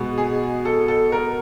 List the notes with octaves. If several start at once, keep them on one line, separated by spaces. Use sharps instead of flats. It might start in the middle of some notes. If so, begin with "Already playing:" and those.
Already playing: B2 G#3 B3
G#4
A4
A4
A#4